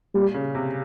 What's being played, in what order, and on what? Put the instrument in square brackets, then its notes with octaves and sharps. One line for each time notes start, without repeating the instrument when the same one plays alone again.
[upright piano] A#2 [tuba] G3
[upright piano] C#3
C3